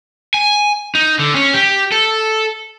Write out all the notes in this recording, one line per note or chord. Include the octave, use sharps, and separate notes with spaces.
G#5
D#4
D3
C#4
G4
A4